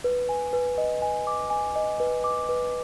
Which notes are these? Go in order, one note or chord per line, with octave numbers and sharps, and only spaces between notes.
B4
G#5
B4
D#5
G#5
D6
G#5
D#5
B4
D6
B4